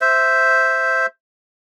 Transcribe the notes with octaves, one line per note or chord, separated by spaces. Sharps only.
C5 E5